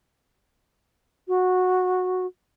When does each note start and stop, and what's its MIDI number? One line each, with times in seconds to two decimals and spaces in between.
1.28 2.26 66